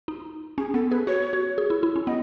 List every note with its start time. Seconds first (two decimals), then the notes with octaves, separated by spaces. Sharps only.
0.08 D#4
0.58 C#4 G#4
0.74 B3 A4
0.91 G#4 B4
1.07 F#4 C#5
1.33 F#4
1.58 G#4
1.70 E4
1.83 E4
1.96 C#4
2.07 B3 D#5